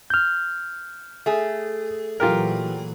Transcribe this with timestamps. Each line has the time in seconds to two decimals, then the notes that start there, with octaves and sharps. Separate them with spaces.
0.10 F6 G6
1.26 A3 G#4
2.20 A#2 E3 F#3 F4 G4 A#4